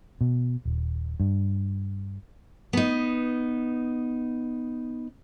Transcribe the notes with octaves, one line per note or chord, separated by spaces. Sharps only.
B2
D#1
G2
B3 D#4